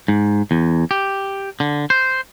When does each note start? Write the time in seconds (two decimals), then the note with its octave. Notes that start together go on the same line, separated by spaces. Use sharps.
0.08 G#2
0.51 E2
0.91 G4
1.60 D3
1.90 C5